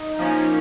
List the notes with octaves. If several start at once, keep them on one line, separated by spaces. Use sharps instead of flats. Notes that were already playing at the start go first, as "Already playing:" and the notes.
Already playing: D#4
F3 A#3 C#4